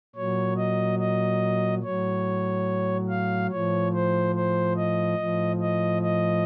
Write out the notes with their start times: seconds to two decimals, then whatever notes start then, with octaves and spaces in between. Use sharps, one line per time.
0.16 A#2 F#3 C#5
0.57 D#5
0.99 D#5
1.83 A2 F#3 C#5
3.09 F5
3.51 A2 F3 C#5
3.93 C5
4.35 C5
4.77 D#5
5.18 A2 F3
5.61 D#5
6.02 D#5